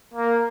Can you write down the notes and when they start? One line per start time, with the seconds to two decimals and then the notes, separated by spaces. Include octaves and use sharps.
0.14 A#3